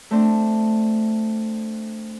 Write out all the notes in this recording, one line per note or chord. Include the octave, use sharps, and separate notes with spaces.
A3 C4 D4